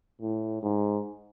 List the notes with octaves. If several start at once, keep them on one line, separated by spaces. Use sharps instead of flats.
A2
G#2